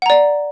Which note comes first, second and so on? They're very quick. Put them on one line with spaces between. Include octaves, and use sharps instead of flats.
F#5 A#5 D5